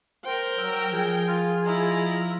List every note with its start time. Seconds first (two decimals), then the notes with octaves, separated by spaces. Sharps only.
0.25 A#4 C5 G5
0.59 F#3 E6
0.92 F3 G#4
1.28 F4
1.66 E4 F4 D#5 A#5